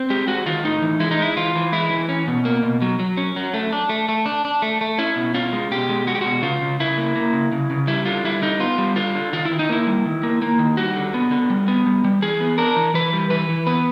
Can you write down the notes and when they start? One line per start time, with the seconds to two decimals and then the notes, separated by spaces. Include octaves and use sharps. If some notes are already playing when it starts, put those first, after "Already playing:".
Already playing: C4
0.10 G#3 G4
0.27 G#3 F#4
0.46 D#3 F4
0.64 A2 D#4
0.82 E3
1.00 G#3 E4
1.11 D#4
1.19 G#3 E4
1.37 E3 F4
1.55 E3
1.72 G#3 E4
1.91 E3
2.09 C#4
2.28 B2
2.45 A#3
2.63 B2
2.82 F#3
3.00 F#3
3.17 C#4
3.36 F#3
3.54 A3
3.73 D4
3.89 A3
4.09 A3
4.26 D4
4.45 D4
4.62 A3
4.81 A3
4.98 C#4 E4
5.16 B2
5.34 C#4 F4
5.53 G#3
5.71 B2 G4
5.89 G#3
6.07 G#3 F#4
6.15 G4
6.21 B2 F#4
6.43 C#3 F4
6.61 C#3
6.80 C#3 E4
6.98 A#3
7.16 A#3
7.33 C#3
7.52 C#3
7.71 C#3
7.87 G3 E4
8.06 D3 F4
8.25 G3 E4
8.42 D3 D#4
8.60 B3 F4
8.78 G3
8.96 D3 F4
9.15 D3
9.33 D#3 F4
9.45 E4
9.51 D#3
9.59 D#4
9.69 A#3 E4
9.87 G3
10.06 D#3
10.23 A#3
10.42 A#3
10.59 D#3
10.77 G3 F#4
10.96 D3
11.14 B3
11.31 D3
11.50 G3
11.68 B3
11.87 G3
12.04 G3
12.22 E3 G#4
12.40 B3
12.58 D4 A#4
12.76 E3
12.94 E3 B4
13.13 G3
13.30 E3 B4
13.49 E3
13.67 B3 B4